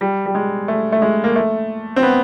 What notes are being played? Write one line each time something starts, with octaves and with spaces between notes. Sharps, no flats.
G3
G3
G#3
A3
A3
G#3
A#3
A3
C4
B3